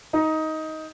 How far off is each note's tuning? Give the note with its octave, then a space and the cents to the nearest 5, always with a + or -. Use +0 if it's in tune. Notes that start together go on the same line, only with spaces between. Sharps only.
D#4 +15